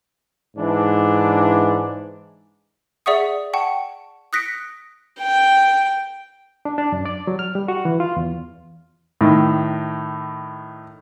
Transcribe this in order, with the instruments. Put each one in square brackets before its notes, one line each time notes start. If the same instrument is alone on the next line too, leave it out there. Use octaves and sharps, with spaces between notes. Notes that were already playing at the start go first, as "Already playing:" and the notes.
[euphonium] G#2 [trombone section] E3 D4
[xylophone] G#4 D5 E5 F#5 C#6 D#6
F#5 G5 A5 C#6
D#6 F#6 A#6 B6 C#7 D7
[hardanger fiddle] G5
[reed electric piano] D4
D4
F#2
D5
F#3
F6
G3
F#4
E3
F4
E2
[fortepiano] A2 D#3